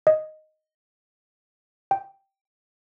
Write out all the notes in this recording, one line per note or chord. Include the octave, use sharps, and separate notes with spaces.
D#5
G5